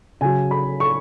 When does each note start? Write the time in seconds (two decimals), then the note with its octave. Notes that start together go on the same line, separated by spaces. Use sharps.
0.21 C#3 F#3 G#5
0.51 B5
0.80 C#6